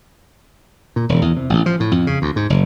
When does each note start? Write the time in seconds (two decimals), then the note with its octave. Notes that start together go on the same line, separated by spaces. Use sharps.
0.96 A#2
1.09 E1
1.22 E2
1.37 C3
1.50 A1
1.66 F3
1.80 A2
1.92 F2
2.07 C#3
2.22 D2
2.36 G#2
2.50 F#1